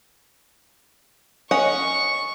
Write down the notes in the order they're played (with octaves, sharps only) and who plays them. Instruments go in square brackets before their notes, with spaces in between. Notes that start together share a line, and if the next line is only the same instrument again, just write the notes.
[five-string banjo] C#4 D#5 F#5 [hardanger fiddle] C#6